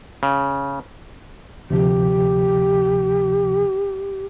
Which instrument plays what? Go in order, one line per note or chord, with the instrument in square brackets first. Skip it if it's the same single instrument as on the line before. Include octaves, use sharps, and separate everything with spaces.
[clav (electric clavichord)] C#3
[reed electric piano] D2 C3 F3 [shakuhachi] G4